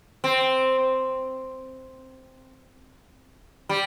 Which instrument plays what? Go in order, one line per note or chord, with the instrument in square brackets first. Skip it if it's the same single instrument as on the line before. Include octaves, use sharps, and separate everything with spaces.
[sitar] C4
G3